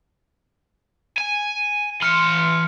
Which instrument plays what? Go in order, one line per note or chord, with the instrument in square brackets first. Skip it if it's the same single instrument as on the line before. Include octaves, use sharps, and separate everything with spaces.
[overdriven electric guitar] G#5
[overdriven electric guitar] E3 C6 [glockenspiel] F6 C#7